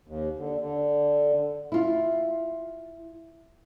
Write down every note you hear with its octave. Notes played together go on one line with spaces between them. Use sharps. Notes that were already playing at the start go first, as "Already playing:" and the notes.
D#2
D3
D3
E4 F4